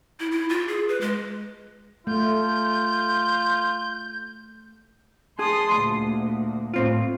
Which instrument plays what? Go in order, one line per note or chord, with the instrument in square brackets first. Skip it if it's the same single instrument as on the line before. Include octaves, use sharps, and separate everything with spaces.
[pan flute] E4
E4
F4
G#4
B4
G#3
[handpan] A3 [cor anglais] F4 [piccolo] G6
[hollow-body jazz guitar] G#4 [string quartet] A5 C6 D#6
[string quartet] D2 A#2
[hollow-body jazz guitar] A2 C4 F4